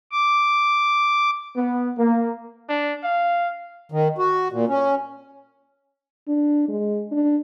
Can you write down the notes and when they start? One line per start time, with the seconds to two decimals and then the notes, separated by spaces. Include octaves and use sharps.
0.12 D6
1.56 B3
1.98 A#3
2.69 D4
3.04 F5
3.92 D#3
4.18 F#4
4.52 A#2
4.68 C#4
6.28 D4
6.69 G#3
7.12 D4